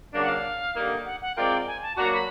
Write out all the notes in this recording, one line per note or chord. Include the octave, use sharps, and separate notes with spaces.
C#3 F#3 A#3 D4
F#5
F5
D3 G3 A#3 D#4
F#5
F#5
G#3 C4 F4 A#4 D5 G5
G#5
A5
F#3 A#3 D4 F#4 A#5
B5